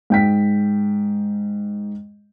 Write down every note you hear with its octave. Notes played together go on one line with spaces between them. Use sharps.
G#2 G5 B6